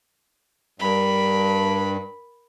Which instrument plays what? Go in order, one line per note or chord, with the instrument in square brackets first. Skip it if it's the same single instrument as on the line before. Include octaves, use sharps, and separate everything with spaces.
[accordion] G2 [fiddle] A#4 B5